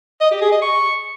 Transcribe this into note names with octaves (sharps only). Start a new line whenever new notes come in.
D#5
G4
G#4
D#5
C#6